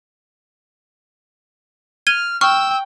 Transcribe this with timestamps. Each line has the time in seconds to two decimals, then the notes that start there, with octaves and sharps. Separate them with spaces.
2.07 F6 G#6 D#7 G7
2.41 G5 C#6 E6 F6